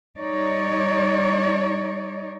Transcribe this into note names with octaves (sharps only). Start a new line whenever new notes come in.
G3 D#4 C#5 D5